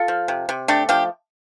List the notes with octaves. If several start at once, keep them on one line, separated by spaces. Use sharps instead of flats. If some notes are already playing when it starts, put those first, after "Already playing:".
Already playing: F4 A4
F3
C3
C3
A3 D4 G4
F3 D4 G4